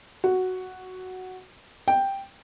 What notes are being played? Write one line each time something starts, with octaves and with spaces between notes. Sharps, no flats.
F#4
G5